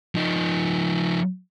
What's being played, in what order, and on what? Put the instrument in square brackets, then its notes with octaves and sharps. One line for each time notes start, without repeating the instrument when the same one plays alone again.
[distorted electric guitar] F3 D#4